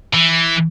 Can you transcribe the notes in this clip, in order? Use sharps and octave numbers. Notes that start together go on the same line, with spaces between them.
E3